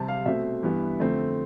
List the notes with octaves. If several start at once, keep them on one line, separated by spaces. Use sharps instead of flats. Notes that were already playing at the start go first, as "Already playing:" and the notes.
Already playing: C3 G3 C4 A5
F5
B2 A3 C4 E5
G2 E3 B3
F2 D3 A3 C4